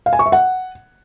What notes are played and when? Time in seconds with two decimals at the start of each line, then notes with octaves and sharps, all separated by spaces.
0.06 F5
0.13 G#5
0.19 C#6
0.26 E5
0.32 F#5